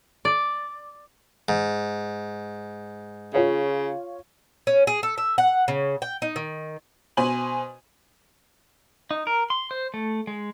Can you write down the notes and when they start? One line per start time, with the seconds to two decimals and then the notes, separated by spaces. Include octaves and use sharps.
0.25 D5
1.49 G#2
3.34 C#3 F4 C#5 F5
4.67 C#4
4.87 G#4
5.03 A4
5.18 E5
5.38 F#5
5.68 C#3
6.02 G5
6.22 D#4
6.36 D#3
7.17 B2 C5 G#5 F#7
9.11 D#4
9.27 A#4
9.50 C6
9.71 C5
9.94 A3
10.27 G#3